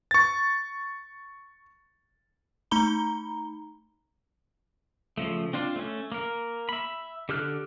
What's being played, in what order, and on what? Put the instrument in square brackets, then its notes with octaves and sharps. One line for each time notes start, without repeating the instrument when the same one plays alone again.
[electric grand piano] C#6 A6
[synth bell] A3 D#4 A#5 B5 G7
[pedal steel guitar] C#3 F3 A3
C4 D4 F4
A3 C#4
A#3 A#4
E5 B5
D3 G4 A4 F6 F#6